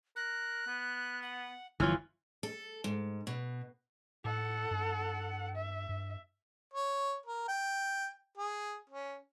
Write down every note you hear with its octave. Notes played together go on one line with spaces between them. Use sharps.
A#4 F#6
B3
F#5
G1 E3 F3 F4 C#5
A4
G#2
B2
A2 A4 F#5
G2
E5
G2
C#5
A#4
G5
G#4
C#4